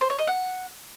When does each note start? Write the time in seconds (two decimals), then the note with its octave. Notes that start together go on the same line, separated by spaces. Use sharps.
0.01 C5
0.10 C#5
0.19 D#5
0.27 F#5